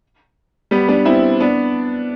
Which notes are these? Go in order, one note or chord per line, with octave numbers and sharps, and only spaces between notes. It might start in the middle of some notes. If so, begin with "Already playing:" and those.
G3 B3
B3 D4
C4 E4
B3 D4